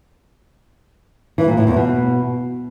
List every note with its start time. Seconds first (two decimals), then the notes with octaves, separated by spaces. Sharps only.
1.38 E3
1.48 A#2
1.57 A2
1.67 E2
1.77 B2